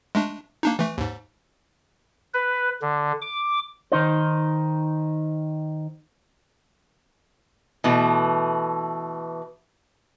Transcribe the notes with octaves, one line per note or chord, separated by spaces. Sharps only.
G#3 A3 D4
A#3 D4 D#4
E3 A3
D#2 G#2
B4
D3
D6
D#3 D#4 C5
B2 E3 A3